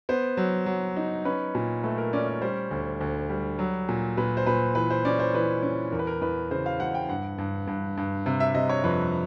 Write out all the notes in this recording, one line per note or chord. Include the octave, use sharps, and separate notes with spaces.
B3 C5
F#3
F#3
D#4
C#4 B4
A#2
A3 B4
A#4
C#4 D5
D5
G3 C5
D2
D2
G3
F#3
A#2
A#2 B4
C5
A#2 B4
E3 B4
C5
C#4 D5
C5
E3 B4
C#4
E2 A#4
B4
A#4
E2 B4
C#3 C5
F5
E2 F#5
G5
G2 F#5
G2
G2
G2
C3
E5
C3 D#5
C#5
F2 B4